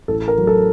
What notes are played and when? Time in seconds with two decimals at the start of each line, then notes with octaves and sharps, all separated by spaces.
0.08 A1 A4
0.28 A#4
0.38 F#3
0.47 A4